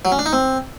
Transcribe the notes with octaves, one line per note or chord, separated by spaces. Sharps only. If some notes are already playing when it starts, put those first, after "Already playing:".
F#3
C#4
D4
D#4
C4